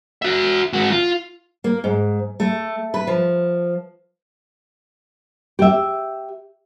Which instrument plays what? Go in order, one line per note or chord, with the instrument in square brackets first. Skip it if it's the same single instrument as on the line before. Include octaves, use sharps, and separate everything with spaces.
[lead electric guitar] F#4 E5
G#2 F#4
F4
[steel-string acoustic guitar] A#3
G#2
A3
B4
F3
[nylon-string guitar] G4 E5